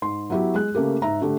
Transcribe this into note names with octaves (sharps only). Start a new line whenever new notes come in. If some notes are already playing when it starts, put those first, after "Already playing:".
G#2 C6
F#3 B3 E4 F#4 G4
G#3 G#4 F#6
C#3 A3 A#3 G4
G#2 E5 A#5
D3 A3 G4